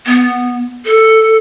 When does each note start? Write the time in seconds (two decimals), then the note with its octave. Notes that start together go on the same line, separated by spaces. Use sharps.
0.07 B3
0.86 A4